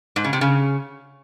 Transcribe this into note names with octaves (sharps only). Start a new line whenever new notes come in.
G#2
C#3
C3
C#3